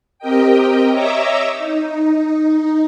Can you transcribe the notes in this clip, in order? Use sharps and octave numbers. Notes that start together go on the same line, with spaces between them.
C4 G4 A#4 D#5 G5
C#5 D#5 E5 A#5 D6 E6
D#4